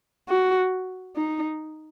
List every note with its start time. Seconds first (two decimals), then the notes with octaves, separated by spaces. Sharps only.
0.29 F#4
1.16 D#4